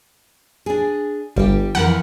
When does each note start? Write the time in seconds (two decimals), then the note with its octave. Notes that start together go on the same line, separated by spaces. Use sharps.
0.66 D4 G#4
1.36 G1 G3 G4
1.75 F2 E3 A#4 F#5